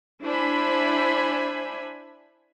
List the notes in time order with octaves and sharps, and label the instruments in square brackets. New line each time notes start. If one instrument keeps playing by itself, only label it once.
[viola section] D4 E4 C5 G#5 B5